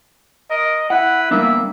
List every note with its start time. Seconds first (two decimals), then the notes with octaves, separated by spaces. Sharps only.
0.50 A#4 D#5
0.90 E4 B4 F#5
1.31 G3 A#3 B3 D4 E5